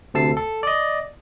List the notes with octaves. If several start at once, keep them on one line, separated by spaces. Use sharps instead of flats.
D2 C3 A4 A5 E6 C7
A4
D5 D#5